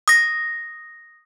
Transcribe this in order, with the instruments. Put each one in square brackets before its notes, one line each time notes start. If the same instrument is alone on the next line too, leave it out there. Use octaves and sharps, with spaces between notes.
[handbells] D#6 A#6